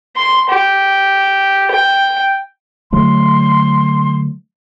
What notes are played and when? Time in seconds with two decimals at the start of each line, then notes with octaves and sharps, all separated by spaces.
0.16 C6
0.49 G4
1.71 G5
2.92 D3 F#3 A3 C6